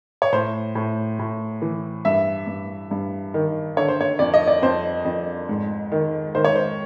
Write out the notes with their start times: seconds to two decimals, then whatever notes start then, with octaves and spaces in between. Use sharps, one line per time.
0.22 C#5
0.33 A2 C5
0.75 A2
1.19 A2
1.62 E3
2.05 G2 E5
2.47 G2
2.91 G2
3.34 D#3
3.77 D3 C#5
3.88 C5
4.01 C#5
4.19 F2 D5
4.34 D#5
4.47 D5
4.62 F2 C5
5.05 F2
5.49 G#2
5.92 D#3
6.35 D#3 C5
6.44 C#5
6.56 C5